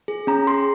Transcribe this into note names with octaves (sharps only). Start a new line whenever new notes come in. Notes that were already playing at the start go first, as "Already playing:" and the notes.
G#4
C#4 A#5
G#4 C6